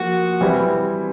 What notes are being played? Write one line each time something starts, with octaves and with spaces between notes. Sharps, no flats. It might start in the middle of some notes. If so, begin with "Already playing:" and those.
Already playing: F3 A#3 F#4
E3 G3 C4 E4